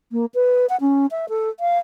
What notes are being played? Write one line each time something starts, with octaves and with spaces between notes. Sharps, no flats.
A#3
B4
F#5
C#4
E5
A4
F5